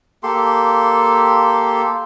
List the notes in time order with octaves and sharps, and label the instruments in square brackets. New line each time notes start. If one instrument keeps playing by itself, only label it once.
[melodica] A#3 G4 A4 C6